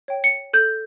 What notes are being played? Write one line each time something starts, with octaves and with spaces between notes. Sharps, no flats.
C#5 G5
C#7
A4 G6